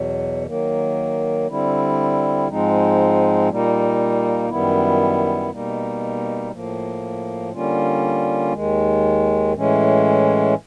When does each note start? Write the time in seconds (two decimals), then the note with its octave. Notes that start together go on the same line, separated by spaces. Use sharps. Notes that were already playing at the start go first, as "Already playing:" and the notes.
Already playing: E2 B2 F#3
0.46 D#3 F#3 A#3
1.47 D3 G3 C4 E4
2.48 G#2 F3 G#3 C4 D#4
3.49 A#2 G3 A#3 D#4
4.50 F#2 D#3 G3 B3 E4
5.50 B2 G3 A#3 D#4
6.52 A2 F3 A#3
7.52 D3 G3 A#3 C#4 F4
8.53 D#2 D#3 G#3
9.53 A2 E3 G#3 C#4